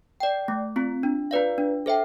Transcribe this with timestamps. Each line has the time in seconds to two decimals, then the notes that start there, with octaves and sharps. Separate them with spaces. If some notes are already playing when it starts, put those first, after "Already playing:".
0.20 D5 G5
0.48 A3
0.76 C4 F4
1.03 D4
1.31 F4 B4 D5 F5
1.58 D4
1.86 A4 C5 E5 G5